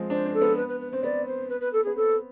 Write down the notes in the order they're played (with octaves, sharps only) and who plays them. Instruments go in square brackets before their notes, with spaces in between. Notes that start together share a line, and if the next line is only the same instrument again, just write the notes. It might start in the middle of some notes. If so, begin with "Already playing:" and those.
Already playing: [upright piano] F3 G#3 C4
[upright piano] D4 [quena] C5
[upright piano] C4
[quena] A4
[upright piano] B3
[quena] B4
B4
B4
[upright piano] C4 [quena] C5
[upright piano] B3 [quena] D5
[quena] C5
B4
B4
A4
[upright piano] B3 [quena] G#4
[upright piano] C4 [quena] A4